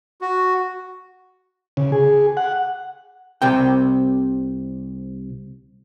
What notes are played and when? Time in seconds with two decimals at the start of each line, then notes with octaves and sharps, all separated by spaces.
0.21 F#4
1.77 C#3
1.92 G#4
2.37 F#5
3.42 C2 C3 G5